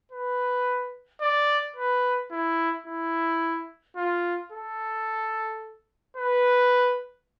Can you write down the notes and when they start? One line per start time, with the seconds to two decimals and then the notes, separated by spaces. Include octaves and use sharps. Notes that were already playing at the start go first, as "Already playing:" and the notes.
0.12 B4
1.21 D5
1.76 B4
2.31 E4
2.87 E4
3.97 F4
4.52 A4
6.17 B4